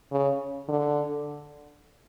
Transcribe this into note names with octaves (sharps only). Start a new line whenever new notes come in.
C#3
D3